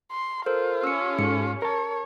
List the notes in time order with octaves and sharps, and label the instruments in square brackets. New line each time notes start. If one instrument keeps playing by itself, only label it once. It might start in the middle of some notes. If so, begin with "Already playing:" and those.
[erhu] C6
[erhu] F4 [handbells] A4 A#4 C5
[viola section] C#4 G4 A4 [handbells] E6 C#7
[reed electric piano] G#2 [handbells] C#7
[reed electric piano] A#4 A5 [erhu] C#5